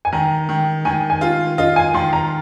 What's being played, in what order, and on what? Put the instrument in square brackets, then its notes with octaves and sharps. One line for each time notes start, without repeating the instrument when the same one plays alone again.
[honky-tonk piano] G#5
[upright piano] D#3 [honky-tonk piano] A#5
[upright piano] D#3
[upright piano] D#3 [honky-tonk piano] G#5
[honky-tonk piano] G#5
[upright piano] F4
[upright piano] F4 [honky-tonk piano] D#5
[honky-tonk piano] G#5
[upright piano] D#3 [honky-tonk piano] C6
[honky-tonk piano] A#5